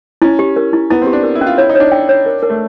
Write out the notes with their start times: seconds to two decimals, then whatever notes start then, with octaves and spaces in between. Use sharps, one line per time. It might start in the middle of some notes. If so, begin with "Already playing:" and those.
0.22 C#4 E4
0.39 G4
0.56 A#4
0.73 E4
0.90 B3 E4
1.02 C4
1.07 G4
1.13 D4
1.23 A#4
1.35 E4
1.41 C#4
1.47 F4
1.58 E4 C#5
1.69 D#4
1.75 D4 C#5
1.92 G5
2.09 C#5
2.26 A#4
2.43 A#4
2.50 A3